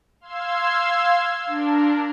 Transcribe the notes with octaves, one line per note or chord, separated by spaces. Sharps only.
F5 C6 E6 G#6
D4 A#4